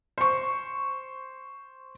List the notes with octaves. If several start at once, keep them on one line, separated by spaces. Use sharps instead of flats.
C5 C#6